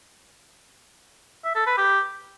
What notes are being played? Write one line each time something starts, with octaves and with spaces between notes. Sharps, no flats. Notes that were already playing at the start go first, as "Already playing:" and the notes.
E5
A4
B4
G4